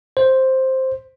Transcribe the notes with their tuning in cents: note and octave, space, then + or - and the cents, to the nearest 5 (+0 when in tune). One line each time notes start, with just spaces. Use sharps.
C5 +5